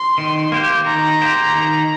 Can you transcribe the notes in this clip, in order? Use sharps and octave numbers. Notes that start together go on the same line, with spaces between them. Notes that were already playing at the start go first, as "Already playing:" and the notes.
Already playing: C6
D#3
A#3 G4 C5
D#3 A#5
A#3 G4 C5
D#3